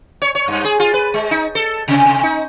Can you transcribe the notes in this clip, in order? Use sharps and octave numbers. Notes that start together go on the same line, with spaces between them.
C#5
C#5
G2
G#4
F4
B4
G#3
D#4
A4
C3
C3
D#4